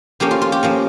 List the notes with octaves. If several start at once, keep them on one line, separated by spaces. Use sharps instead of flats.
F3 A#3 C#4 G4
F4
F4
G4
F3 A#3 C#4